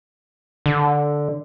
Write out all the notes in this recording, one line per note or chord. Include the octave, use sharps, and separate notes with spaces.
D3